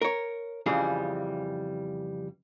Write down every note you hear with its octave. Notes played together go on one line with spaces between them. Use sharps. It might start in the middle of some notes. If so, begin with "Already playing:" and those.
A#4 C#5
F2 C#3 E3 G3 G#4